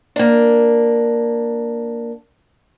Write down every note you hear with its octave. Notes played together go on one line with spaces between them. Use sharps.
A#3 D4